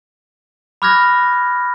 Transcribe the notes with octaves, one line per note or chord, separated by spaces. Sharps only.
B5 D6 F6 F#6 G#6 A#6